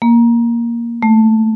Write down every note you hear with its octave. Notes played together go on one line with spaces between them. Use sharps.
A#3
A3